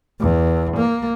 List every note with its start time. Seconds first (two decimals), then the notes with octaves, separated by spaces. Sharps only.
0.20 E2
0.76 A#3